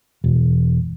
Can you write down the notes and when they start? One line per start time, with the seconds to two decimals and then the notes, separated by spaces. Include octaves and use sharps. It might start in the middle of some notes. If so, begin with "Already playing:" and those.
0.24 E1